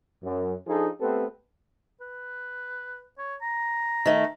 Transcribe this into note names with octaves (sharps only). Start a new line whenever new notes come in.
F#2
F3 D4 D#4 F4 G#4 A4
A3 B3 C4 G4 A4 B4
B4
C#5
A#5
D#3 A3